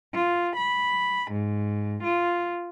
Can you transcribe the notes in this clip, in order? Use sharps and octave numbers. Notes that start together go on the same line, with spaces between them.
F4
B5
G#2
F4